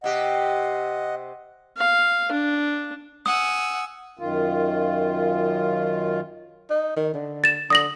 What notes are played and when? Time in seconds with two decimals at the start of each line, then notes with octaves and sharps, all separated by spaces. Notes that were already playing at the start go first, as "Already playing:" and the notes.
0.04 C3 G4 D#5 F#5
1.77 F5
2.32 D4
3.26 F#5 G#5 D#6 E6
4.19 F#2 D#3 F4
6.70 D#4
6.97 D#3
7.14 D3
7.44 A6 E7
7.70 D3 D#6 A#6 F#7